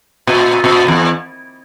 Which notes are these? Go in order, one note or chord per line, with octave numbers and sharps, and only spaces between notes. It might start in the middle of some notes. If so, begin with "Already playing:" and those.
A#2
A#2
E2